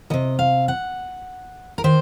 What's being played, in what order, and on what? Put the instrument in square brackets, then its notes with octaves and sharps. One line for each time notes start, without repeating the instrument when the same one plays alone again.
[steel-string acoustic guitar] C3 D#3 D#5
F5
F#5
A#4
D#3 C5